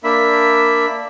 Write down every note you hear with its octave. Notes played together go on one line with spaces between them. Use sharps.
A#3 D4 E5 B5